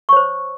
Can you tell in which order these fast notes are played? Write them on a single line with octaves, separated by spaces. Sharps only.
C#6 C#5 C5